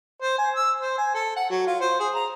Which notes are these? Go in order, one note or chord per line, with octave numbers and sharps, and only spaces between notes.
C5
G#5
E6
C5
G#5
A4
F#5
F#3
F4
C5
G#4
A#5